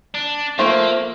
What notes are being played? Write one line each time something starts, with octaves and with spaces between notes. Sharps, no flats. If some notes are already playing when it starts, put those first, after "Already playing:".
D4
F3 A3 A#3